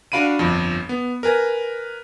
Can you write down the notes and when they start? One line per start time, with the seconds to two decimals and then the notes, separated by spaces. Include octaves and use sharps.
0.12 D4 F#4 F5 B5 D7 D#7
0.39 G1 F2
0.89 B3
1.23 A#4 B4 G#5 A#6